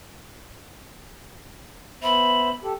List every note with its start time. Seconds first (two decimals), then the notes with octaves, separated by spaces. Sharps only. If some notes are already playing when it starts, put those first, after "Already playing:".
2.03 B3 C5 E5 B5
2.64 G4 A4